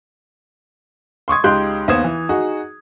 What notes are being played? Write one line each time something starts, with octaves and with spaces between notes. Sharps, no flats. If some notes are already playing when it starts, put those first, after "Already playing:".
C6 C#6 D#6 G#6
C#2 D#4 G4 C6 F#6 G6
D#2 B3 C5 D#6 G#6 E7
E3
D#4 F#4 G#4